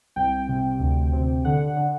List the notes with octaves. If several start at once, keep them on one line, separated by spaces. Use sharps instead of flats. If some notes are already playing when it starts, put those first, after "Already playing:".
C2 G5
C3
D2
C3
D3 F#5
D3